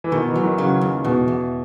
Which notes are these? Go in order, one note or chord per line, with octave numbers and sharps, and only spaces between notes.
E3
B2 D#3
E3
F#3
D#3
C#3 F#3
D#2
E2 B2
E2